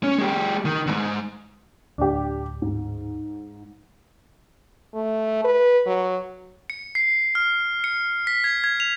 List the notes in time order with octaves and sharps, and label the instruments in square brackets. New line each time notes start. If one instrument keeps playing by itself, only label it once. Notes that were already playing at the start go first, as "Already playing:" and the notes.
[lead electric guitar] C#4
G#3 G4
D#3
E2 G#2
[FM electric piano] D2 A2 [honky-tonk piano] D4 G4
[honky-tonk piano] G#2
[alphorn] A3
B4
F#3
[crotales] C#7
C7
F6
C#7
B6
G#6
G#6
F7